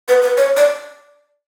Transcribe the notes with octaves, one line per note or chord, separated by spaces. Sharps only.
B4
B4
C#5
D5